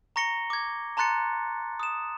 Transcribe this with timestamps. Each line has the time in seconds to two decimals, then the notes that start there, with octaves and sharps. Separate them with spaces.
0.16 A#5 C#6 A#6 C#7 G7
0.50 D6 G#6
0.97 A5 A#5 C6 F#6 A6 C#7
1.80 D#6 E7